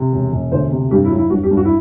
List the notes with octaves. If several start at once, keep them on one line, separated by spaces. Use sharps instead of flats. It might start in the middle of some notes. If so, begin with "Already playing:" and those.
Already playing: C3
E1
E1
D2 C5
C3
G2 G4
E4
F#3
E4
G2 F#4
G4
G2
F#4
E4